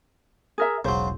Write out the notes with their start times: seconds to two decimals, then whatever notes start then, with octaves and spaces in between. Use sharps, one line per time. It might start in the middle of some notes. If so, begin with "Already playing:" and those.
0.58 G#4 A#4 E5
0.85 E1 B1 C#3 F#3 C5